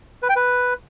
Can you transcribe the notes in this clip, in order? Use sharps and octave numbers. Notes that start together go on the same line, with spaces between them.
B4
G5
B4